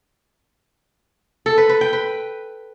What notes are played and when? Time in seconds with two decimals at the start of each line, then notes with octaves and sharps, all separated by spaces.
1.46 A4
1.58 B4
1.69 B4
1.81 G5
1.93 B4